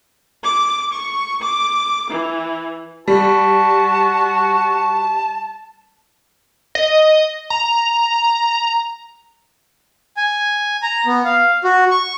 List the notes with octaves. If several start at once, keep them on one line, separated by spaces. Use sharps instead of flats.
D6
C#6
D6
E3
G3 F#4 A5
D#5
A#5
G#5
A#5
B3
F5
F#4
C#6